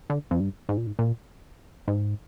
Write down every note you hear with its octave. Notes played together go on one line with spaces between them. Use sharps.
D3
F2
G2
G#2
A#2
G#2
A#2
G#2